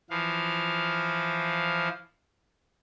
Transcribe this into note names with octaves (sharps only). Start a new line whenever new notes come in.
E3 F3 F5